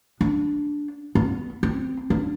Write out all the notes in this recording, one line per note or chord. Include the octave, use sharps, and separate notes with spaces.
D4
B3
C4
D4